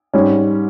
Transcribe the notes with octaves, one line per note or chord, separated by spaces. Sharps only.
G#2 G3 C#4